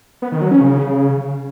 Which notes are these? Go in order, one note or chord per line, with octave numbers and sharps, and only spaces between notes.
B3
D#3
F#3
C#4
C#3